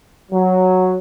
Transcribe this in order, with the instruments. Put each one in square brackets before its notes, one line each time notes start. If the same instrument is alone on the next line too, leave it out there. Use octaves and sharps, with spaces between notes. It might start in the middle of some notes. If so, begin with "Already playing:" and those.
[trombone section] F#3